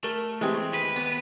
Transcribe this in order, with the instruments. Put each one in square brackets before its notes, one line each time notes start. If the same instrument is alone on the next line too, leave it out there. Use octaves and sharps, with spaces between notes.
[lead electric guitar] A3 [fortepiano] A#4
[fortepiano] E3 G4 [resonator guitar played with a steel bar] G#3 C4
[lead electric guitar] D#2 B4
[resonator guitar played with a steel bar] B3